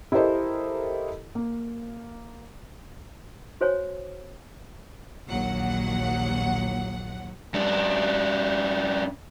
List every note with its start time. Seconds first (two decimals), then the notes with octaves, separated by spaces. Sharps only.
0.12 E4 G4 A4 A#4 C5 D#5
1.35 A#3
3.61 F#4 C5 C#5 G#5
5.28 A#1 D#2 F#3 F#5
7.54 F#2 D4